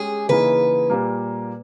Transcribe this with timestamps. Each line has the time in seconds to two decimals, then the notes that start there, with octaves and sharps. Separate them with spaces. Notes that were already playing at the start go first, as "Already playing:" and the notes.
Already playing: G#3 C#4 G4 G#4
0.29 C#3 E3 A#3 D#4 G#4 B4
0.90 A#2 G3 A#3